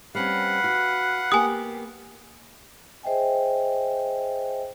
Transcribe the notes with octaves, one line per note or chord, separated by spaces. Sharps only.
G3 C4 C#4 B4 F5 F#5
F#4
A#3 B3 G4 G#5 D#6
G#4 C5 D#5 E5 G5 G#5